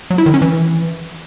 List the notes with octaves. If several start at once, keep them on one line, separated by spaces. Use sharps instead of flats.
F#3
E4
D#3
C#4
E3